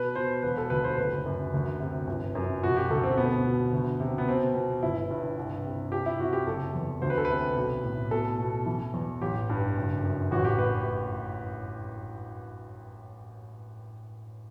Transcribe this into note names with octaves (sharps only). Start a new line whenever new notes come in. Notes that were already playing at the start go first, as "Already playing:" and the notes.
Already playing: B2 B4
B2 C5
E1 B4
A4
D2 B4
C5
F#1 B4
F#2
D2
C3
G1
F#2
E1 F#4
G4
D2 A4
C4
B2 B3
B2
D2
C3
B3
B2 C4
B2
G1 E4
G2
C2
C3
C2 G4
E4
C3 F#4
G4
F#1 A4
E2
D2 C5
B4
A4
B4
C3
B1
A2
B2 A4
B2
E3
E2
A1 G4
G2
F#1
F#2
A1 F#4
G4
A2 B4